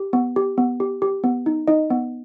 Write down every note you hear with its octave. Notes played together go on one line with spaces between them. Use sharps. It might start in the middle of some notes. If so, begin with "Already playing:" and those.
Already playing: G4
B3
G4
B3
G4
G4
B3
D#4
D#4 D#5
B3